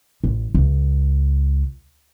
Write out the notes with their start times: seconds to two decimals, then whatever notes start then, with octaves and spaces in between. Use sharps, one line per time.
0.24 A1
0.54 C#2